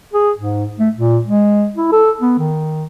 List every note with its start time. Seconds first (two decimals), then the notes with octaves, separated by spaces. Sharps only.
0.13 G#4
0.38 G#2
0.79 A3
0.96 A#2
1.25 G#3
1.76 E4
1.92 A4
2.21 B3
2.38 D#3